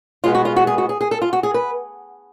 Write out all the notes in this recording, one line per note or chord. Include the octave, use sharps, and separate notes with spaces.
B2 G#3 B3 F4
F#4
F4
F#4
G#4
F#4
G#4
G#4
A4
F4
F#4
G#4
B4